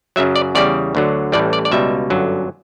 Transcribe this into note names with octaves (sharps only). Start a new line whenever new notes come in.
F#2 C#3 F#3 E5
D5
E2 C#3 G3 D5
D2 D3 F#3
A1 A2 E3 G3 D5
D5
D5
C#2 B2 G3 E5
G1 F#2 D3 F#3